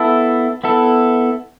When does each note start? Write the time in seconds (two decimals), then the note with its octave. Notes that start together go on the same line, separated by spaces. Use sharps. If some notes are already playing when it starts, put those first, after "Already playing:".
Already playing: B3 E4 A4
0.64 B3 E4 A4